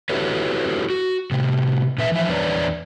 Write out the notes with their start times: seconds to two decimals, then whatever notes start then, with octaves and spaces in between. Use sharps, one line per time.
0.10 E4 F#4 G4 A4 B4 C#5
0.90 F#4
1.32 A2 C3
1.98 A#2 B4 E5
2.12 E3 F3 E5
2.28 E2 D4 B4 C#5 D5 A#5